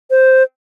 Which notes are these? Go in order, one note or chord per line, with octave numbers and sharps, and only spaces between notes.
C5